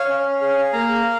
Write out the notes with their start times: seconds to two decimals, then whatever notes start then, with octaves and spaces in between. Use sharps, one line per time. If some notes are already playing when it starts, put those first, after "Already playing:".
Already playing: C#5 F5
0.08 C#4
0.41 G#4
0.73 A#3 F5 A#5